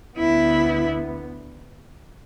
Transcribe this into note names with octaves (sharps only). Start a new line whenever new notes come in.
D2 D3 B3 E4